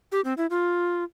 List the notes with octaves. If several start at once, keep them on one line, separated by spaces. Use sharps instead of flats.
G4
C4
E4
F4